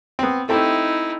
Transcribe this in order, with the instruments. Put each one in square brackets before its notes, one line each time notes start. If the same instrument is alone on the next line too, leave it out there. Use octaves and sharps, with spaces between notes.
[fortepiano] B3 C4
[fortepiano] A3 C4 G4 [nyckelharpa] D#4 E4